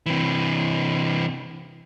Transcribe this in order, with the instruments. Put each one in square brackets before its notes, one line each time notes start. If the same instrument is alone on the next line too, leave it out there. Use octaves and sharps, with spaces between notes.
[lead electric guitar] C3 E3